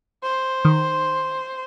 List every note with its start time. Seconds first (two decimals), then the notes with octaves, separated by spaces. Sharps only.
0.23 C5
0.65 D#3